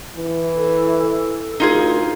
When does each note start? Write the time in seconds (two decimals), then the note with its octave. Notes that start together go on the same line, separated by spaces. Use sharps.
0.16 E3
0.56 A4
1.60 D2 D#4 F4 G#4 A#4